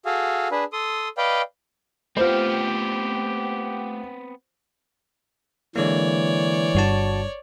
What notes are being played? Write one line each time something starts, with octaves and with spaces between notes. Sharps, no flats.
F#4 G#4 A4 F5
D4 G#4 B4
A4 C6 D#6
B4 D5 D#5 F5 G5
A3 B3 C4 F4 G4 C5 F6
D3 E3 G#3 A#3 C#5 D5
G1 G2 F#4 A5